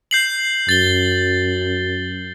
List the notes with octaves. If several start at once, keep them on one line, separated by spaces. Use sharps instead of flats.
G6 C7 F#7
F#2 A6 G7